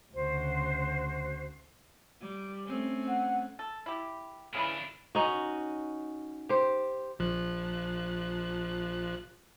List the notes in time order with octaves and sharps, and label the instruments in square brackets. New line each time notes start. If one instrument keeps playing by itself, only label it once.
[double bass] D2 C#3 [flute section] F#4 C5
[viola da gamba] G3
A3 C4 C#4
[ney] F#5
[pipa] A4
E4 G4
[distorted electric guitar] A2 D4 [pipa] C#3 E3 B5
[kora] C#4 D#4 F#4
G4 C5
[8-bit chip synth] A#1 F3 F#6